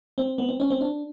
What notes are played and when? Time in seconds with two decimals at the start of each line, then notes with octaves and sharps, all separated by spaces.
0.18 C4
0.38 B3
0.49 C4
0.60 C#4
0.70 C4
0.81 D4